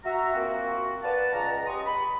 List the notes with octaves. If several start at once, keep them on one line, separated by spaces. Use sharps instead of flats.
F#4 E5 A#5
A#3 C4 F4 F#4
B4 D5 F5 F#5 A5
C#2 A#5
G4 D#5 C6 C#6 D#6
B5